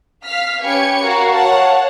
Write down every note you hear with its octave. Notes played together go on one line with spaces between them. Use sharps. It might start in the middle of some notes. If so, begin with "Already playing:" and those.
F5 F6 B6
C#4 G4 B4 G#6 C#7
F#4 A#4 F5
C#5 F5 F#5 A5